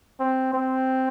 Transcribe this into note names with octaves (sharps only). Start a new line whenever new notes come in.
C4
C4